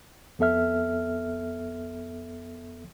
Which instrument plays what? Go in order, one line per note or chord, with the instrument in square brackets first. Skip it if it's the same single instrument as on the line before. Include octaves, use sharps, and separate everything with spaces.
[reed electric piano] F2 B3 A4 E5 F6